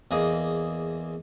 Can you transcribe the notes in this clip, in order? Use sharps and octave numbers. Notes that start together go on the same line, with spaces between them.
E2 A#3 G#4 D#5